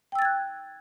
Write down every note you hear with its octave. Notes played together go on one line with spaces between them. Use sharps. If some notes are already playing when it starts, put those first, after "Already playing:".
G5 E6 F#6 G#6 A6